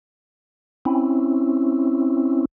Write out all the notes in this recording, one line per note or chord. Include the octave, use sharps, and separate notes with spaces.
C4 C#4 E4